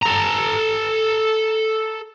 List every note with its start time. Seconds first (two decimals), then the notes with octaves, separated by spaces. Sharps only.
0.02 A4 A#5